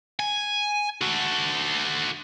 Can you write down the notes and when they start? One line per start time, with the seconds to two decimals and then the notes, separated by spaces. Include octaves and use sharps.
0.19 G#5
1.02 F#4 A4